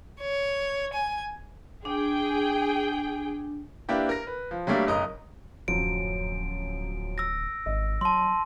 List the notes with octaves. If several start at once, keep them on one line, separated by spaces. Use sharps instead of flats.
C#5
G#5
D4 G#4 G5
A#3 D4 E4 G4 B4
A#4 A#6
B4
F3
F#3 G3 A3 A#3 D4
F#1 B1 D#5 A#5 D#6
D1 F#2 F3 F#3 D7
E6 A#6
G#1 D#5
F#3 A5 C6